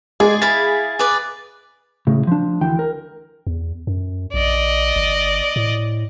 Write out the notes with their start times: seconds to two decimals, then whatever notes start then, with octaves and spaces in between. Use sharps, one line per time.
0.20 G#3 G#4 D5
0.42 E4 F5 B5 A6
0.99 G#4 B4 D5
2.07 A2 C#3
2.27 F3 D4
2.61 D2 E3 G5
2.79 A#4
3.47 E2
3.87 F#2
4.34 A#1 D5 D#5
4.96 G1
5.56 A2